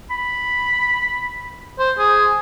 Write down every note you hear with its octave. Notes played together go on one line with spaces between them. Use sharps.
B5
C5
G#4